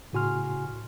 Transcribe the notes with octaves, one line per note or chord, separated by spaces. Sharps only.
A2 C#3 F#4 G#5 C6 F6